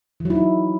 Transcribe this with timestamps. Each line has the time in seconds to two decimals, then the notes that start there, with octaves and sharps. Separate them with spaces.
0.20 E3
0.25 F#3
0.30 E4
0.35 D#4